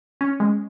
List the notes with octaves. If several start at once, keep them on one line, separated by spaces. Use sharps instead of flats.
C#4
G#3